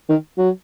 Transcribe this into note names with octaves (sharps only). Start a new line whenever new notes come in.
D#3
F#3